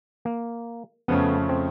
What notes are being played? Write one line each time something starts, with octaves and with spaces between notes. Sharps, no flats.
A#3
F2 C#3 F3 A3 B3 C#4
C4